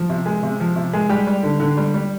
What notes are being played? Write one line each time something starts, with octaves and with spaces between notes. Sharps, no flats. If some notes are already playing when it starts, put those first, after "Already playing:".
Already playing: F3
C3
G#3
C3
F3
C3
G#3
G3 G4
G3
D3
D3
G3
G3